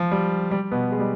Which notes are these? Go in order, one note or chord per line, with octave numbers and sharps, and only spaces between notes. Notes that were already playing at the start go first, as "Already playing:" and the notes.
Already playing: F3
G3
G3
B2 B3
G#3
G3